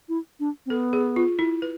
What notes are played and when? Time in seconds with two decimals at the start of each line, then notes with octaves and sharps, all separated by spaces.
0.09 E4
0.40 D4
0.66 C4
0.70 B3 A4
0.93 G#4
1.16 F4
1.39 E4
1.62 B4